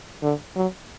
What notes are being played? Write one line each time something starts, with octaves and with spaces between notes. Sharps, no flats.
D3
F#3